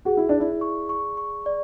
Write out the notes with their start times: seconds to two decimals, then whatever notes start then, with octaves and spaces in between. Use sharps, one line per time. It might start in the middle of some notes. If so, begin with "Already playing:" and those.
0.05 F#4 G#4
0.17 E4
0.29 D4 D5
0.40 E4
0.61 C#6
0.89 C#6
1.17 C#6
1.46 D5